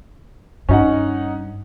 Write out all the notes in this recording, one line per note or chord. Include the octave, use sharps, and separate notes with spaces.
G2 C#4 D#4 F#5